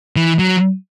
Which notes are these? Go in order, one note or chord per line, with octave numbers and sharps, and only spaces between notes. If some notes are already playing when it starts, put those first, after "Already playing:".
E3
F#3